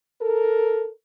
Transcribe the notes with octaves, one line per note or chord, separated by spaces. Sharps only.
A4 A#4